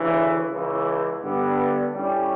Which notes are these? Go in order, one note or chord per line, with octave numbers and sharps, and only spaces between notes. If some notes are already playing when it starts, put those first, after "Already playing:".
Already playing: D2 C#3 E3
C#2 C#3 E3
G2 D3 G3 B3
A2 G3 C#4